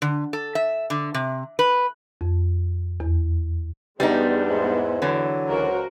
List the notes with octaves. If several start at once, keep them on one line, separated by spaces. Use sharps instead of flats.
D3
A4
E5
D3
C3
B4
F2
E2
E2 G3 G#3 B3 D4 D#4 C5
G#2
D3 E3 F#3
C#2 F#4 A#4 C5